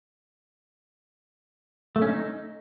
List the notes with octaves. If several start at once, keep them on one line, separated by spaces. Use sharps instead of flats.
A3
C#4
D#4